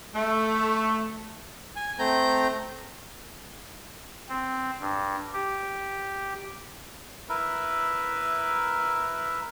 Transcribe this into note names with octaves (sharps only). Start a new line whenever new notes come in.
A3
G#5
A3 C4 A#5 G6
C4
G2
G4
E4 A#4 B4 E5